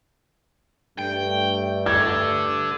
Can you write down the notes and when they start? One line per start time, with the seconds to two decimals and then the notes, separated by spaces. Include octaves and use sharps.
0.98 G2 A3 G5
1.86 D3 G#6